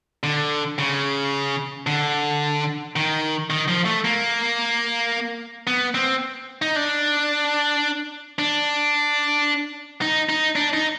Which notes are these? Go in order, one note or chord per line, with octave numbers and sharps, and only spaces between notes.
D3
C#3
D3
D#3
D#3
F3
A3
A#3
B3
C4
D#4
D4
D4
D#4
D#4
D4
D#4